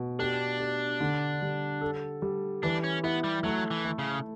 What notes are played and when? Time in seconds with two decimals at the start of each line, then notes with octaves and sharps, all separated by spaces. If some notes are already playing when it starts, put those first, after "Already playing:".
Already playing: B2
0.19 D4 G4
0.60 G4
1.00 D3
1.42 G3
1.81 A4
2.22 G3
2.63 E3 D4
2.84 C#4
3.04 B3 E4
3.24 G3
3.44 F#3 A3
3.71 E3
3.85 A3
3.99 C#3